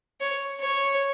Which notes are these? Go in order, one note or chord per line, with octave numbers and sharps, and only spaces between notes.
C#5
C#5